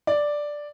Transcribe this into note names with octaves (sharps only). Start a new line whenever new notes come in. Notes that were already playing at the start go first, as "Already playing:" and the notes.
D5